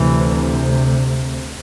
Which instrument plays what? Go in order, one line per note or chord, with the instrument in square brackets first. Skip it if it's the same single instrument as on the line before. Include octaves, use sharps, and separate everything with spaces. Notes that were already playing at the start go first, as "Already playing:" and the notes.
Already playing: [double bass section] D2 C3 E3